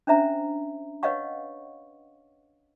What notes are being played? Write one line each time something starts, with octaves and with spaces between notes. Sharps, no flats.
C#4 D4 C5 E5 A#5
B4 C#5 D#5 F5 F#5 C#6